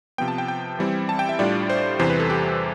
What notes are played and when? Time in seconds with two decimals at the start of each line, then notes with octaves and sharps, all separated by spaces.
0.18 C3 F3 B3 G5
0.28 A5
0.38 G5
0.48 G5
0.79 E3 G3 C4 E4
1.09 A5
1.19 G5
1.29 E5
1.39 A2 G3 D4 F4 D5
1.70 C5
1.99 E2 C3 E3 C5
2.10 B4
2.20 A4
2.30 G4